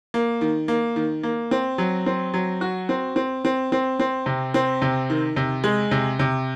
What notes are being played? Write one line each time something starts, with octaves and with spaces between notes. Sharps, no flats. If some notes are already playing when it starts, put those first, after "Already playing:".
A#3
D#3
A#3
D#3
A#3
C4
F#3
C4
F#3
F#4
C4
C4
C4
C4
C4
C3
C4
C3
D#3
C3
G#3
C3
C3